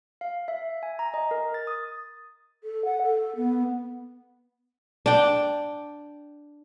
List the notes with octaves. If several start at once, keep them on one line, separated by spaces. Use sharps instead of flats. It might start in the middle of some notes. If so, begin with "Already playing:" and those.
F5
E5
G#5
A#5
D#5
A#4
A6
D#6
A4
F#5
A4
B3
D4 G5